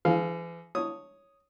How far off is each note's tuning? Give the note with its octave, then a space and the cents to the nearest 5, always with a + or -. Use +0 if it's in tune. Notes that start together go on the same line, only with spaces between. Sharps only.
E3 +40 G#4 +25 F5 +0
C#5 +0 D#6 +0